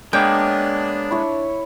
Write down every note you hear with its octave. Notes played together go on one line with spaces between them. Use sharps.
G#3 A#3 B3 D4 C#5 G5
E4 C#5